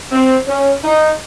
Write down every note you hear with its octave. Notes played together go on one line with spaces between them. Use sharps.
C4
C#4
D#4